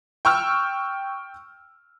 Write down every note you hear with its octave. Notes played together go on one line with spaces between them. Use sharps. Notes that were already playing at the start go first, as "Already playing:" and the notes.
G5 C#6 E6 F6